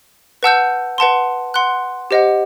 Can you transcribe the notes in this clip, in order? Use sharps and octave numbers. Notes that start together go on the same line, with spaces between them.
B4 F#5 A5 E6 G6
B4 F#5 A5 C6
F#5 C6 F#6
G4 C5 D#5 F#5